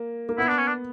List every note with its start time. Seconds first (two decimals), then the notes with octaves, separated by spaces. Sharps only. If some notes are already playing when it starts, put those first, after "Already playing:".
Already playing: A#3
0.29 A#3
0.38 B3 E4
0.47 D4
0.58 C#4
0.67 D4